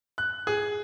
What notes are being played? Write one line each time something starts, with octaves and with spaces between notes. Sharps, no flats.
F#6
G#4